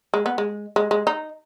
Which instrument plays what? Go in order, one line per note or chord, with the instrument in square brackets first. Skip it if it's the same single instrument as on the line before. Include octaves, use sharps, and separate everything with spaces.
[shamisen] G#3
B3
G#3
G#3
G#3
D#4